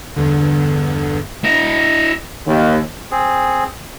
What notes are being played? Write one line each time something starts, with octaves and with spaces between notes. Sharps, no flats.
E2 G2 D3
E4 D#5
D#2
C4 G#4